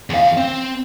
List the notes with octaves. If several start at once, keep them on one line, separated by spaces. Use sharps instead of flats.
E2 F5
C4